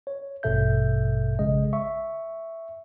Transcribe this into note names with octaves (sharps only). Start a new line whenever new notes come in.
C#5
A1 G2 B2 A4 E5 G6
A#1 C#3 G#3 D#5
E5 C#6